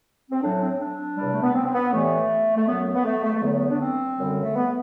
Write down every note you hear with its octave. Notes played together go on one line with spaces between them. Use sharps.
C4
A2 F#3 D4
D4
C4
D4
E2 C3 G3
A3
B3
C4
C4
B3
A2 E3 G3 A3
A3
F#2 F#3 B3
B3
A3
A3
A3
E2 D3 F#3 B3
D4
C4
F#2 D3 G3
A3
B3